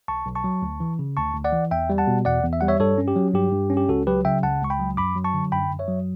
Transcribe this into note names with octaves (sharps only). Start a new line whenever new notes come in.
B1 A5 C#6
B1
A5 C#6
F#3
D2
E3
C#3
D2 A5 C#6
D2
D5 F#5
E3
E2 E5 G5
G3
F#5 A5
B2
E2 D5 F#5
E2
E5
G3 F#5
C#5 E5
G2 A4 C#5
C#4
G4
F#3
G2 G4
G2
C#4
G4
C#2 F#4 A4
F#3 G4 B4
C#3 E5 G5
C#2 F#5 A5
C#2 C#6
G5 B5
F#3
F#2 B5 D6
F#3
A5 C#6
D3
F#2 G5 B5
F#2
C#5 E5
F#3